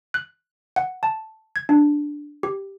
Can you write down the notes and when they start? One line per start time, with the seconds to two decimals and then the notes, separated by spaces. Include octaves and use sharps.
0.14 F#6
0.76 F#5
1.03 A5
1.56 G#6
1.69 D4
2.43 G4